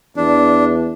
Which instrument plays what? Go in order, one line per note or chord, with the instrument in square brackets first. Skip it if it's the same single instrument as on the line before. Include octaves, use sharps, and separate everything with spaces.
[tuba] E2 [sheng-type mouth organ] D4